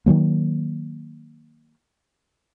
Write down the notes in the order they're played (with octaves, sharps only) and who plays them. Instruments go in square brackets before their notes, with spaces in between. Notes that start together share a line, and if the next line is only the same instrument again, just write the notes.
[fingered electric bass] D#3 F3 F#3 A#3